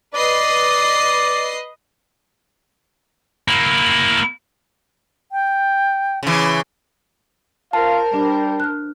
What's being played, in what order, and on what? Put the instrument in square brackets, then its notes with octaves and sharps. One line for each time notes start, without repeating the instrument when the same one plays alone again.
[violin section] B4 D#5 C7 [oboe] D5
[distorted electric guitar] A#3 E4
[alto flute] G5
[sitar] C#3 E3
[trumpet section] F4 F5 [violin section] A#4 C5 [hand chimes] A5
[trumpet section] G3 [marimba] D4
[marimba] F6 F#6